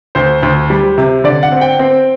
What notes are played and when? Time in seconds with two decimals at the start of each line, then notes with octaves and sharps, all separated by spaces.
0.15 D2 C5
0.43 D2
0.70 G3
0.98 C3
1.24 D3 D5
1.43 F#5
1.52 C4
1.61 G5
1.79 C4